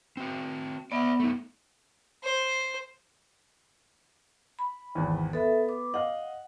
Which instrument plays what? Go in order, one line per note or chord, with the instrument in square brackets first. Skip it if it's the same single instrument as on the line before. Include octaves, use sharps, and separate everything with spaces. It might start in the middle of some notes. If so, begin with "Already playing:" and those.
[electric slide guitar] C4 F#4
[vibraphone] B3 F#5 [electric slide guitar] D5 E5
[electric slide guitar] A3 D#4
[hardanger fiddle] C5
[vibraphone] B5
[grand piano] G#1 E2
[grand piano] B3 [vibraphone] A4 E5
[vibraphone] D6
[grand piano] D#5 F5 [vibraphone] F#5